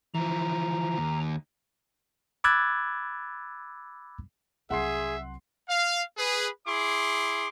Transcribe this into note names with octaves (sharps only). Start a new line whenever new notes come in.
E3 F3 A#5
D#2
B5 D6 E6 F#6 G#6 A6
C2 F#3 G#4 E5 F#5 C6 C7
F5
G#4 B4
E4 G#4 C6 D6